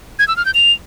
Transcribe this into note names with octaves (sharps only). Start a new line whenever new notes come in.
G#6
E6
F6
G6
F7